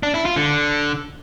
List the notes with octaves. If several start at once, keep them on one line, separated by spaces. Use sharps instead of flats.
D4
E4
F4
D3